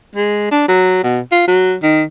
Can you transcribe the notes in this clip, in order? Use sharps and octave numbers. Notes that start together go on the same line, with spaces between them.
G#3
D4
F#3
B2
F4
F#3
D#3